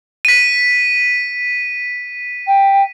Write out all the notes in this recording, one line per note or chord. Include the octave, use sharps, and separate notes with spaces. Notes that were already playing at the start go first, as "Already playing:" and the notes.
B6 D#7
G5